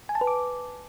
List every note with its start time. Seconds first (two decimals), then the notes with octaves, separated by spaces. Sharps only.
0.09 G#5
0.15 A5
0.21 B4
0.27 D6